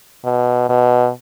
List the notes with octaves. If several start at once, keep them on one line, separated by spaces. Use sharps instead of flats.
B2
B2